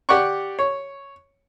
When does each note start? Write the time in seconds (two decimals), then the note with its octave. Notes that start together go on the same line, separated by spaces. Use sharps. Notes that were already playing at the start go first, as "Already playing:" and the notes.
0.09 G4 D5 F#5 C#6
0.59 C#5